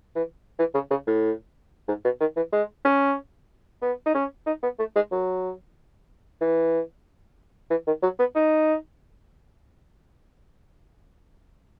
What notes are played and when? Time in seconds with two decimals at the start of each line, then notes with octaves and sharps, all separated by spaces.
0.16 E3
0.59 E3
0.74 C#3
0.91 C#3
1.07 A2
1.88 G#2
2.04 B2
2.20 D#3
2.36 E3
2.53 G#3
2.85 C#4
3.82 B3
4.06 D#4
4.15 C#4
4.47 D#4
4.63 B3
4.79 A3
4.96 G#3
5.12 F#3
6.41 E3
7.70 E3
7.87 D#3
8.03 F#3
8.19 B3
8.35 D#4